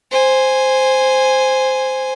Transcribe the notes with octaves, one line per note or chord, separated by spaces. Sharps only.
C5 G#5